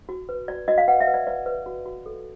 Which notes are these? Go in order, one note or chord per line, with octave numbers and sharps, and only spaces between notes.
F#4
B4
F#4 D5
F#4 D#5
F5
B4 F#5
E5
B4
D5
B4 D5
B4
F#4
F#4
A4